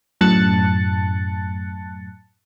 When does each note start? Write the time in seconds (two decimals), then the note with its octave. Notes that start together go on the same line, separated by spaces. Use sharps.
0.21 F#2 A2 A5 F#6 A6 C#7